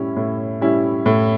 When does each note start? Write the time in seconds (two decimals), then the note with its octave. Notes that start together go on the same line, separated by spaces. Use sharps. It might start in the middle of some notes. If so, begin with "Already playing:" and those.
Already playing: A2 G3 C#4 E4
0.16 A2
0.61 G3 C#4 E4
1.06 A2